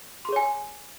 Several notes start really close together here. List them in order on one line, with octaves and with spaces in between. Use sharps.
C6 G#4 C#5 G#5